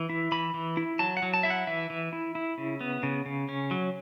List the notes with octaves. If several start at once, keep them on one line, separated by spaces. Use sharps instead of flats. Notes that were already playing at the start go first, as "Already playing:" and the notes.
Already playing: E3
E4
E3 B5
E3
E4
F#3 A5
F#5
F#3
A5
E4 E5
F#5
E3 E5
E3
E4
E4
C#3
B3
C#3
C#3
C#4
F#3